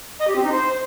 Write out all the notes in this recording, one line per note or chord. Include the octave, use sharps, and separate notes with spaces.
D#5
G4
C4
D#4
C5